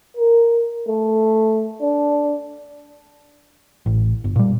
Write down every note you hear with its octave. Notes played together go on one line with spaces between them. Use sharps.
A#4
A3
D4
A1
G1
A#2 G3